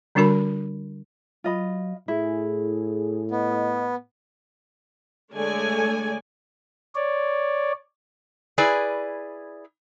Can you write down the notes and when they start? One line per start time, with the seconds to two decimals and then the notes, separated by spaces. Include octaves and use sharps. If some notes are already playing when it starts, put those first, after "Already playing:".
0.15 D3 G3 D4 F#4 A#4 B5
1.44 F#3 F4 D#5 B5
2.08 A2 E4 G#4
3.31 B3 D#5
5.33 D3 G#3 A3 C#5 D5 G#5
6.95 C#5 D5
8.58 E4 G#4 B4 D5 G#5